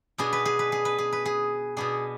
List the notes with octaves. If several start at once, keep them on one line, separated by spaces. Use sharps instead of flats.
B2 B3 D4 G#4
B4
G#4
B4
G#4
B4
G#4
B4
G#4
B2 B3 D4 G#4